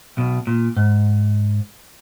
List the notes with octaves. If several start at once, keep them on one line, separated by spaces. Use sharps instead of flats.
B1 B2
A#2
G#2